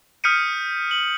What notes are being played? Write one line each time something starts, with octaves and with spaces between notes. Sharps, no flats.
D#6 F6 G6 B6 C#7 D#7
F#7